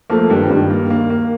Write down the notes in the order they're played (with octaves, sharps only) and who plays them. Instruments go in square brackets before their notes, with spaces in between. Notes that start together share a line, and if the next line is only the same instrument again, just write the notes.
[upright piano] F3 A3 [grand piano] A#3
[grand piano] G2 [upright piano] D#3 G3
[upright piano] F3
[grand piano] G2 [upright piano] D#3 G3
[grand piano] A#3
A#3
A#3